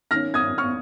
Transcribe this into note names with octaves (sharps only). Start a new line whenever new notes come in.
D#3 C#4 F6 A#6
D#6 G#6
C#6 F6